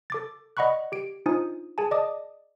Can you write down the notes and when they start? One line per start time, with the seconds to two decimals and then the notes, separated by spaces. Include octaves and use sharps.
0.10 A4 D6 A6
0.57 D5 D#5 F#5 B5 C#6 F#6
0.92 G4 D7
1.26 D4 D#4 F4 C5 G#5 D#6
1.78 G#4 G#5 A5
1.91 D5 D#5 A5 D6 D#6